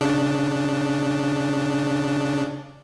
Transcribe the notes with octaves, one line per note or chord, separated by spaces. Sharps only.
C#3 D4